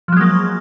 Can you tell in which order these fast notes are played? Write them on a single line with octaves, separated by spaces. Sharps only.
F3 F#3 G#3 A#3